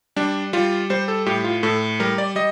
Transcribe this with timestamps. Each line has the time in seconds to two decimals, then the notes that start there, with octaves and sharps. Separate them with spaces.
0.16 G3 D4
0.53 G3 F4
0.90 G3 C5
1.08 A4
1.26 A2 G4
1.44 F4
1.63 A2 A4
2.00 G3 A#4
2.18 D5
2.36 G3 D#5